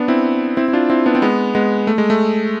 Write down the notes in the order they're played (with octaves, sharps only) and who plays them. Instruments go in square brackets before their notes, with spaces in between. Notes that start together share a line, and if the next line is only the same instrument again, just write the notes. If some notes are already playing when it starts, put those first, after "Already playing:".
Already playing: [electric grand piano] B3 D4
C4 E4
C4 E4
E4
D4 F4
C4 E4
B3 D4
C4
G#3 B3
G#3 B3
A3
G#3
A3